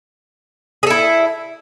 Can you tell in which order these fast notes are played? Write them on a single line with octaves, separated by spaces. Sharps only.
G#4 A4 E4